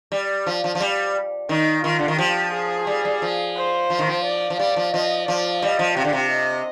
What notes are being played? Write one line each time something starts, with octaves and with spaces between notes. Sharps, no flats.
G3
F3
F3
F3
G3
D#3 D#4
D#3 F4
D3
D#3
F3 G4
G#4
G3
G3
F3
C5
F3
D#3
F3
D5
F3
G3 D5
F3
F3 D#5
F3 D5
G3 D#5
F3
C3 G4
D3
C3
D#5